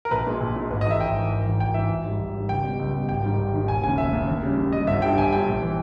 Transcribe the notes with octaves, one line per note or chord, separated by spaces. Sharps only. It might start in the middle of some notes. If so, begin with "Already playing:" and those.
A#4
A#1 B4
A#2 G#3
A#1
A#2 G#3
G#1 B4
D#5
G#2 E3 G#3 E5
G#1 G5
G#2 E3 G#3
G#1
G#2 E3
G#1 G5
G#2 E3 E5
G#1
G#2 G3
G#1
G#2 G3
C#2 G5
B2 G3
C#2
B2 G3
G#1 G5
G#2 D#3 G3
G#1
G#2 D#3 G3
E1 G#5
D#2 C#3 G#5
E1 E5
D#2 C#3
D#2
C#3 G3
D#2
C#3 G3 D#5
G1 E5
G2 G3 G5
G1 G#5
G2 G3 G5
A#1
E3